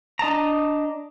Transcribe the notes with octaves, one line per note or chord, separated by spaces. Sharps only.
D4 D#5 A5 A#5